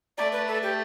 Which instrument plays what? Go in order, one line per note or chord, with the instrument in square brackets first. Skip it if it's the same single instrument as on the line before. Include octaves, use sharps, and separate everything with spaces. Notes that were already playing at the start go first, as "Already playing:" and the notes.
[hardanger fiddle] A3 [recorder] D5
[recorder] B4
A4
G4